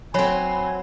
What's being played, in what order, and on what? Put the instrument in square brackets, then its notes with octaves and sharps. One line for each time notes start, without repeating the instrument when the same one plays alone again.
[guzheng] F#3 C4 [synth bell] C#5 B5 [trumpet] G#5